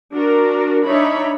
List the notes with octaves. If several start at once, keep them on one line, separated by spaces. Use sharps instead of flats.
D4 F#4 A#4
D4 D#4 C#5 E5 B5